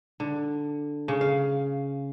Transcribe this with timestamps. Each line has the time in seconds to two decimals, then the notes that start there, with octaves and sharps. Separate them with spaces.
0.20 D3
1.08 C#3
1.21 F5